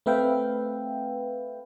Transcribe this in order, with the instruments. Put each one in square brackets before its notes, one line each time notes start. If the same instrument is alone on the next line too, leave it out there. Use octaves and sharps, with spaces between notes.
[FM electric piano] A3 C4 B4 E5 F5 G5